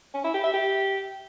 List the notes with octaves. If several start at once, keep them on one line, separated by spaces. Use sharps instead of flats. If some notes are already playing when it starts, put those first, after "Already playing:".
C#4
E4
G4
E5
G4